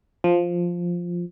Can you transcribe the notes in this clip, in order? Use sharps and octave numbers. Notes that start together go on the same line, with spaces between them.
F3